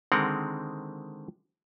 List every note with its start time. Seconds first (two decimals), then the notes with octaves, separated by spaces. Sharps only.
0.12 D3 D#3 G#3 C4 A#4 F#5